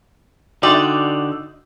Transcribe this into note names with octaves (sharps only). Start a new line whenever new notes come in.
D3 D#4 F#4 D5 G5 C6